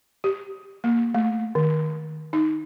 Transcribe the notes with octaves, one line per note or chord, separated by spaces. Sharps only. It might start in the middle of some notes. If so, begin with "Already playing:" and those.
G4
A#3
A3
D#3
D#4